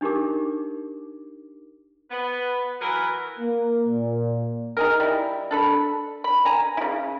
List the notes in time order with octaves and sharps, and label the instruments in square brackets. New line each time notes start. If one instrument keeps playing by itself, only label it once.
[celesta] D4 D#4 G4 A#4 D6
[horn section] B3 B4
E3 F#3 A#4 B4
[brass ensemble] A#3
A#2
[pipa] D#4 G#4 A#4
G3 E4
D4 A4 B5
B5
G#5 A#5
C#3 E4